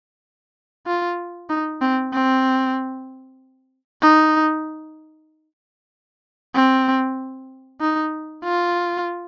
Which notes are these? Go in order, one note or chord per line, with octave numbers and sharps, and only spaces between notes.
F4
D#4
C4
C4
D#4
C4
D#4
F4